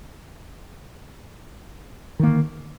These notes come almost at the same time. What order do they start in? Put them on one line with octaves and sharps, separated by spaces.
D#3 A#3 D3